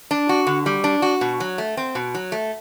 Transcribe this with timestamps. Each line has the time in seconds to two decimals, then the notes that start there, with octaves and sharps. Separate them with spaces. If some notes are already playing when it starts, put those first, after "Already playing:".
0.11 D4
0.29 F#4
0.47 D3
0.66 G3
0.84 D4
1.02 F#4
1.21 B2
1.40 F#3
1.58 A3
1.77 C4
1.95 B2
2.15 F#3
2.32 A3